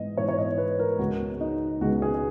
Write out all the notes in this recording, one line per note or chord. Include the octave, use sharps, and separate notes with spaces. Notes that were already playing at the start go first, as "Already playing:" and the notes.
Already playing: G#2 E3 B3 D#5
G#2 E3 B3 C#5
C#5
D#5
B4
A#4
C#2 C#3 G#3 B3 F#4
D#4
C#2 C#3 G#3 B3 F#4
G#4